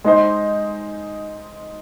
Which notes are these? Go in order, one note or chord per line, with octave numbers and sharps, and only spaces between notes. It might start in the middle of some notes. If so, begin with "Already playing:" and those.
G#3 D#4 C5